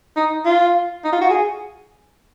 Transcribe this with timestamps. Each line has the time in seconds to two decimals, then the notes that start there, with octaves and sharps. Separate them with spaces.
0.17 D#4
0.45 F4
1.04 D#4
1.13 F4
1.21 F#4
1.30 G#4